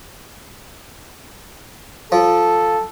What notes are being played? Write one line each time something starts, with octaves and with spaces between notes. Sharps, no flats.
F3 A4